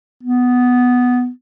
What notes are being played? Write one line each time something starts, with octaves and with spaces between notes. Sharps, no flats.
B3